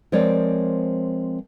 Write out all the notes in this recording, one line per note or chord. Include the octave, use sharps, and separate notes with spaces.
F3 G#3 C4 A#4 C#5 D5